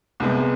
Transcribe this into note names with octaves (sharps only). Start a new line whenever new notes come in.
C2 C3 G#3 B3